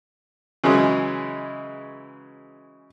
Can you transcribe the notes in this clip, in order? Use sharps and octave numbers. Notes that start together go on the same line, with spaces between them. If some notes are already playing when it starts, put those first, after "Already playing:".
C#3 E3 F#3 G#3